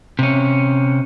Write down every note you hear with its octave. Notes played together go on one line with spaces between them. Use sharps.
C3 C#4